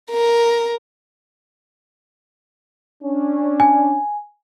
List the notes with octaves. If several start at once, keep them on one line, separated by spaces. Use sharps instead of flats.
A#4
C#4 D4
G#5